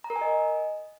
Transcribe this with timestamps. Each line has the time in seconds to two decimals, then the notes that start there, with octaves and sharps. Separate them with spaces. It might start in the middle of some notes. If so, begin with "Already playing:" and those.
0.04 A#5
0.10 A#4
0.16 G#5
0.21 D#5